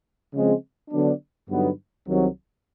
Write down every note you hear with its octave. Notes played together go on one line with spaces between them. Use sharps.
C#3 F3 G#3 C4
D3 F#3 B3 D4
G2 D3 F#3 B3 D#4
C2 C3 D#3 F#3